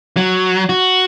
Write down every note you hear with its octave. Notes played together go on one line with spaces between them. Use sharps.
F#3
F#4